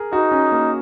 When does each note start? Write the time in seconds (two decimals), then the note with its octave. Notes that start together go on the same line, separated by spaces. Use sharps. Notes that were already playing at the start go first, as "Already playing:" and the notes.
Already playing: G#4 A#4
0.13 D#4 F#4
0.31 C#4
0.52 A#3